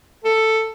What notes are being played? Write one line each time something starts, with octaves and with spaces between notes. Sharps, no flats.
A4